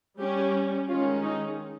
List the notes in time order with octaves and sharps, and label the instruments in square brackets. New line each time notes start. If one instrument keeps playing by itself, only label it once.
[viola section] G3 C#4 G4
D#3 G#3 C#4 F4
D#4